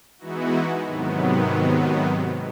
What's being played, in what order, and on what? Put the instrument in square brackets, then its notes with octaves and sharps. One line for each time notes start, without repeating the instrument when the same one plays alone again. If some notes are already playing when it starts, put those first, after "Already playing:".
[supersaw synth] E3 G#3 B3 D#4 E4 F#4
G#2 C3 D#3 F#3 B3